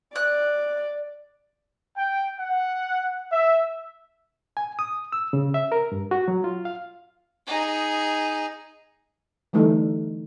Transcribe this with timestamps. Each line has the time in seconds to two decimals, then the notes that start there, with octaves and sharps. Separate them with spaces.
0.15 D5 F#6
1.96 G5
2.40 F#5
3.30 E5
4.57 G#5
4.79 D#6
5.12 E6
5.33 C#3
5.54 E5
5.72 A#4
5.92 G2
6.11 F#4
6.28 F#3
6.44 F4
6.65 F5
7.47 D#4 G#4
9.53 D3 E3 G3 A3 D#4